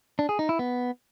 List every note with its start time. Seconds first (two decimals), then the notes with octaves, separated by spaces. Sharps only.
0.19 D4
0.29 G#4
0.39 D#4
0.49 E4
0.59 B3